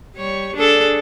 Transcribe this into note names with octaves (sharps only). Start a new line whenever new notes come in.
G3 C#5
D4 G#4 A4